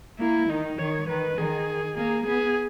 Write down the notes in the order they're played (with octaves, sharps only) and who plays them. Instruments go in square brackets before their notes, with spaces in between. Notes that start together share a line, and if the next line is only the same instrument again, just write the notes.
[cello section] A#3 [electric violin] E4
[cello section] D#3 [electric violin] D#4
[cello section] D#3 [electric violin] C#5
[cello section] D#3 [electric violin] B4
[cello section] D#3 [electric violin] G#4
[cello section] A#3 [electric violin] G#4
[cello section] B3 [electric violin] G#4